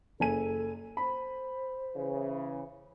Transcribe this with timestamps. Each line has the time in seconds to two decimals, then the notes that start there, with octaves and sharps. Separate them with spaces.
0.20 F#1 A4 G#5 D#7
0.97 C5 B5
1.96 C#3 E3